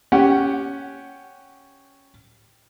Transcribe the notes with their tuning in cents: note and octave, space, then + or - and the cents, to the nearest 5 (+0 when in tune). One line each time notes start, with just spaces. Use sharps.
C#4 +0 G4 +0 F#5 +10